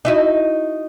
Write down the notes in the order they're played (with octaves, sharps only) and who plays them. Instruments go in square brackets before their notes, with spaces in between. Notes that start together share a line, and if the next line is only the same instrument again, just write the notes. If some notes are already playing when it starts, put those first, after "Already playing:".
[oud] D#4 E4 F#4